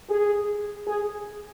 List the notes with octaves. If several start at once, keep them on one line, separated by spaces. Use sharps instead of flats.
G#4
G#4